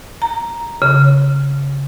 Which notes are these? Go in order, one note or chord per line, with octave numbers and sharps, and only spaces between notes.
A#5
C#3